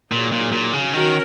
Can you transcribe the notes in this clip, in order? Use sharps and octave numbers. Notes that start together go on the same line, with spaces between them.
A#2 F#3 D#4 G#4
A#2
A#2
C#3
D#3 C#4 F#4 A#4